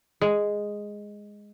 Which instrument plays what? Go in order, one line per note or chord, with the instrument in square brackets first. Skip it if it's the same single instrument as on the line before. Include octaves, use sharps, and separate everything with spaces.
[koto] G#3